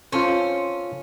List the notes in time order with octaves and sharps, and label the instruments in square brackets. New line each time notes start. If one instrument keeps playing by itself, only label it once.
[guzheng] C#4 [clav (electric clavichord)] F4 A4 C5